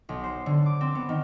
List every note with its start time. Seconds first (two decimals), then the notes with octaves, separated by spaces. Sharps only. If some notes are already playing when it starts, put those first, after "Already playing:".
0.09 B1
0.24 C5
0.46 D3
0.66 D6
0.81 C4
0.95 B3
1.09 D#3